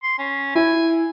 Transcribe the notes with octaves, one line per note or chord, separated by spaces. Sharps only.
C6
C#4
E4 G#5